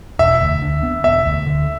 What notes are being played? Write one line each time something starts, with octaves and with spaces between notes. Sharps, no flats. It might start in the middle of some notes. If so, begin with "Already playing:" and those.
E1 E5
D2
D3
B3
E1 E5
D2
D3